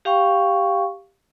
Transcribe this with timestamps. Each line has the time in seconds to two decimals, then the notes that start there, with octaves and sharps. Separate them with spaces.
0.05 G4 F5 G5 C#6